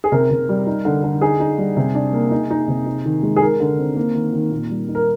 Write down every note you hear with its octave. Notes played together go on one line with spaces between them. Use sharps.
G#4
C3 A#4
C3
G3
D#4
D3
D3
D#4 G#4
D#4
G3
C3
D4
A#3
D#4
D#4
C3
D#4
D#3
G#3
G#4
D#4 A#4
D3
C4
A#3
D#3
D#3
A#2
G3
D#4
A#4